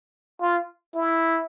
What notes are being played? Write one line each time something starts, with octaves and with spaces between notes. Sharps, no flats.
F4
E4